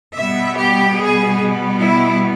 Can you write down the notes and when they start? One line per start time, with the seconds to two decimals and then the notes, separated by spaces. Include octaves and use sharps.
0.16 B2 G3 B3 E5
0.57 G4
0.97 G#4
1.78 E4